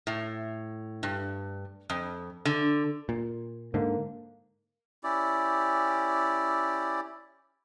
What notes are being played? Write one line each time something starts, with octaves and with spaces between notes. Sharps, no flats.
A2
G2
F2
D3
A#2
G#2 D3 A#3
C#4 E4 G4 D5